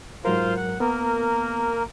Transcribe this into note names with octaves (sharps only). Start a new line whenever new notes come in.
G#2 F#3 F4 A#4 C5 F5
F#5
A#3 B3 A#4